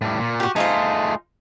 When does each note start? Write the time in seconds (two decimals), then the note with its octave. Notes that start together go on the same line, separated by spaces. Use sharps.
0.01 A2 G3
0.19 A#2
0.40 F#4 G4
0.56 A3 D#4 F4 G#4 C5